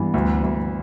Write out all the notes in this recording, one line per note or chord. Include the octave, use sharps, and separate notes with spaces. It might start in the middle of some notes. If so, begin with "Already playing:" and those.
Already playing: G2 E3 B3
D2
D2